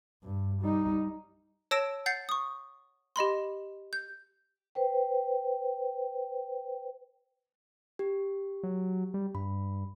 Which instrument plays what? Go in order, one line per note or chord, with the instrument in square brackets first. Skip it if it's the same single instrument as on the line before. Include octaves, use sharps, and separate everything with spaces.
[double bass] G2
G3 D#4
[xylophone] C#5 A5 E6 A#6 D7 E7
F#5 G6 A6 C7
C#6 D#6
G4 D#5 B5 C6
G6
[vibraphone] B4 C5 G5
[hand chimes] G4
[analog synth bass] F#3
G3
[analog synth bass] G2 [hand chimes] B5